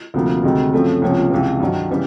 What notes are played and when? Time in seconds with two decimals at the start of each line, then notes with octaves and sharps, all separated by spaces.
0.14 D2 C3 F3 A#3
0.43 D2 C3 D#3 G#3
0.73 F#2 C#3 F3 A3 C4
1.02 C#2 C3 F3 A#3 C#4
1.31 C#2 C3 E3
1.60 G2 D#3 F#3
1.90 C#3 E3 G3 B3